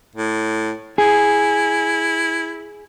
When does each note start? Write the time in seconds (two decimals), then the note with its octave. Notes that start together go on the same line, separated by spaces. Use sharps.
0.15 A2
0.98 E4 G#4